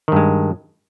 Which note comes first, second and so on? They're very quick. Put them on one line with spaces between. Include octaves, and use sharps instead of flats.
D#3 G2 G#3